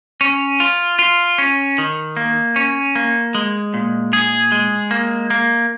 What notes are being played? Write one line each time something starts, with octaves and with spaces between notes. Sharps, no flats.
C#4
F4
F4
C#4
D#3
A#3
C#4
A#3
G#3
A#2
G#4
G#3
A#3
A#3